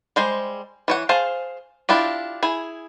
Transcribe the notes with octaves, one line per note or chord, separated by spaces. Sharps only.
G3 G#3 C5
E3 C#5 F#5
G#4 C5 F5 A5
D4 E4 F4 G4
E4 G#4